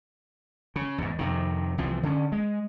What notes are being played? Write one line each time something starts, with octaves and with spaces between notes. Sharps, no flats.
C#3
E2 G#2
F2 C3 D#3
C2 E3 F3 C4
D3 C#4
G#3